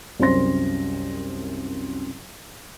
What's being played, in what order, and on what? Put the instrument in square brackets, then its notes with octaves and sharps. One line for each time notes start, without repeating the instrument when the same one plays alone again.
[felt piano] C2 F#2 C#4 C5 C6 A#6